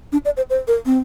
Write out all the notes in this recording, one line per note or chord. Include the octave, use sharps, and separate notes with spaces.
D4
D5
C5
C5
A#4
C4